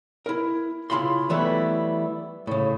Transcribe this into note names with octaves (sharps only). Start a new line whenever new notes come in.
E4 A#4
C#3 E4 F4 B5 C6
E3 F#3 G3 A3 B3 E4
A2 C#3